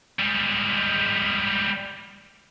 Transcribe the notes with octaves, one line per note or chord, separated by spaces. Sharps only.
G3 G#3